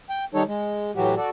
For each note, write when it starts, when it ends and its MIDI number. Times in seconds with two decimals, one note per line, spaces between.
0.10 0.24 79
0.34 0.43 51
0.34 0.43 55
0.34 0.43 63
0.34 0.43 69
0.34 0.43 73
0.47 0.91 56
0.96 1.15 45
0.96 1.15 52
0.96 1.15 54
0.96 1.15 66
0.96 1.15 67
1.17 1.30 66
1.17 1.30 69
1.17 1.30 74